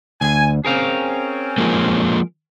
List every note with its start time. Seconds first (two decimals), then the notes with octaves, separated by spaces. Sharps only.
0.21 D2 G#5
0.65 C4 C#4 G#4 A#4 F5
1.58 F3 G#3 A#3